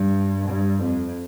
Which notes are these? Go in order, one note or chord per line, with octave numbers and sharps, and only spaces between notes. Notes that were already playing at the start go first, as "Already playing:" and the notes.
Already playing: G2
G2
F2